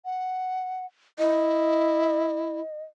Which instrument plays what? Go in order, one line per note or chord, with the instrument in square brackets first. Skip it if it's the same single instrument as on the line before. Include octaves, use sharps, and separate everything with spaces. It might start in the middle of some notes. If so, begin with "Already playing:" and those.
[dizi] F#5
[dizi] E4 [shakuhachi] D#5